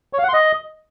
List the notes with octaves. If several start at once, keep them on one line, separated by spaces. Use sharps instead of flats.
C#5
F5
F#5
C6
D#5